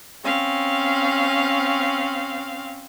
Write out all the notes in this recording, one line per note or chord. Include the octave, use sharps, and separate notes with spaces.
C4 C#4 F5